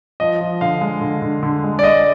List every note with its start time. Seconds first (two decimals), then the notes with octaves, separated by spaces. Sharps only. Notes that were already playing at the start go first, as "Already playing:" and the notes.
0.20 F3 D#5
0.41 F3
0.61 D3 F5
0.81 G#3
1.01 D3
1.22 D3
1.43 D3
1.64 G#3
1.79 D5
1.83 G#3 D#5